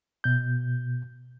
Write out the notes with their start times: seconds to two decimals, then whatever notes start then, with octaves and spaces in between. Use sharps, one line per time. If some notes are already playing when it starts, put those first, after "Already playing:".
0.24 B2 G6